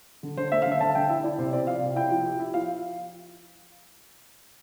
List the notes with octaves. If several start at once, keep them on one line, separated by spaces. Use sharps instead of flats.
D3
D3 C5
A3 E5
F5
D3
E5
D3 A5
D3 G5
E4 E5
E4 D5
C3 C5
C4 D5
F3 F5
C3
E4 G5
F3
G4
E4
F3 F5